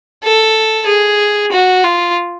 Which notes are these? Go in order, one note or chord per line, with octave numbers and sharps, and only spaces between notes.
A4
G#4
F#4
F4